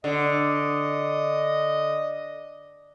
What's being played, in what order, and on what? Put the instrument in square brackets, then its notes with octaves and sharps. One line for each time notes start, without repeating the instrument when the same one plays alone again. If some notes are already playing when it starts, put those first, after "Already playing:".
[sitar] D3 [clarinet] D#5